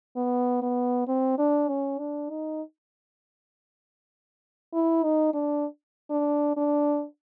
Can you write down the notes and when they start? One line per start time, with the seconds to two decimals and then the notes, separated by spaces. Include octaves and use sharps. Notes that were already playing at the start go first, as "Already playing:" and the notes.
0.16 B3
0.62 B3
1.07 C4
1.38 D4
1.69 C#4
1.99 D4
2.30 D#4
4.74 E4
5.04 D#4
5.34 D4
6.10 D4
6.57 D4